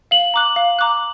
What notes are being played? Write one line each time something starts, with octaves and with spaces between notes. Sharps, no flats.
F5 F#7
A#5 D6 F#6
F5
A#5 D6 F#6